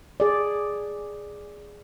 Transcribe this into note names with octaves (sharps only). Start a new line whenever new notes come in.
G#4 D5